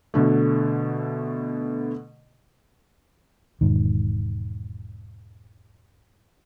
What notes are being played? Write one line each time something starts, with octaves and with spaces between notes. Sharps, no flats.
B2 D3 A3
E1 G#2 D#3